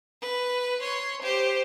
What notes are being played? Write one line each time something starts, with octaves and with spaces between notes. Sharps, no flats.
B4
C#5 C6
G4 C5